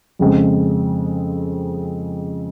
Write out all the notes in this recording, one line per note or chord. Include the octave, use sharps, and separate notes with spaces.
F2 C#3 G#3 C4